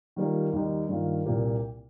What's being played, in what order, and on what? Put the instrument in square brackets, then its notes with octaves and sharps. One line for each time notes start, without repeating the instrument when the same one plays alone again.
[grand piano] D#3 G3 A#3 F4
D#2 D#3 G3 D#4
G2 D#3 A#3 F4
C2 A#2 A#3 G4